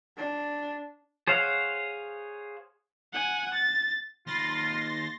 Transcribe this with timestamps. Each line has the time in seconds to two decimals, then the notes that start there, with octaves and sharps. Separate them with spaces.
0.17 D4
1.27 G#4 C5 C#5 F5 F#5
3.13 F#5 G#5
3.54 A6
4.27 D#2 F4 B5 C6 A6 A#6